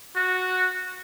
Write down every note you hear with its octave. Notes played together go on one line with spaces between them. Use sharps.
F#4